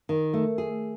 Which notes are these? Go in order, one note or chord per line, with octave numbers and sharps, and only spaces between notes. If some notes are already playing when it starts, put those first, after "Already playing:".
D#3
A3
G#4